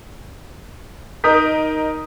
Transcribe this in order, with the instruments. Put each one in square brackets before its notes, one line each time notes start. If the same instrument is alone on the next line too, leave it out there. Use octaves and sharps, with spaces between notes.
[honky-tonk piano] D#4 A#4 [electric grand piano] D#6 G6 B6